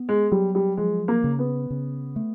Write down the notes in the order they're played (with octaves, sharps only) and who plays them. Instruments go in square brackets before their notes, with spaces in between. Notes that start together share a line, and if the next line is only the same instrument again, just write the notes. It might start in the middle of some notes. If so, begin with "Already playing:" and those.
Already playing: [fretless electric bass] B3
[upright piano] G#3
[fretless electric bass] F#3 [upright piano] G3
[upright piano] G3
[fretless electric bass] F3 [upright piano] G#3
[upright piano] A#3
[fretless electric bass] C#3
[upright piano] B3
[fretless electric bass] C#3
A3